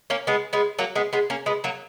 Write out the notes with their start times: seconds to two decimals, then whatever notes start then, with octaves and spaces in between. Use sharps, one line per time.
0.10 A#3 C#4
0.27 G#3 B3
0.53 G#3 B3
0.79 F#3 A#3
0.95 G#3 B3
1.13 G#3 B3
1.30 A#3 C#4
1.46 G#3 B3
1.64 F#3 A#3